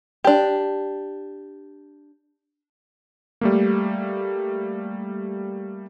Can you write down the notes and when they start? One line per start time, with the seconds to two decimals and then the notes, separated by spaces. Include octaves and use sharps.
0.24 D4 G4
3.41 G3 A3 A#3